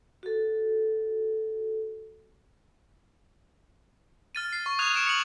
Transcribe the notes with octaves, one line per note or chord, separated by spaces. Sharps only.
F#4 A4
F6 A6 D#7
C7
C#6
D#6 F#6 G#6 F7
D#6 C#7 D7 E7 F7
C#7 F#7